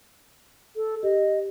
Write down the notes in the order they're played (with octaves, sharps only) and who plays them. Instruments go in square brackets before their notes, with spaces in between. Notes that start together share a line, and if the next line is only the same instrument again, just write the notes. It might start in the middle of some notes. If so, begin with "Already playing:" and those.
[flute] A4
[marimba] G4 [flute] D#5